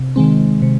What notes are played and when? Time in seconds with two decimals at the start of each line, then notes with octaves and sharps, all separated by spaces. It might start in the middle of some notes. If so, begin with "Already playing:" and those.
Already playing: C3
0.16 D#3 G#3 C4
0.62 C3